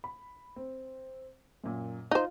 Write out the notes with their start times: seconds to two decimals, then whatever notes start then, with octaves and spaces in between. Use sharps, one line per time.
0.04 B5
0.56 C4
1.64 F#2 A#2
2.11 D#4 F4 C5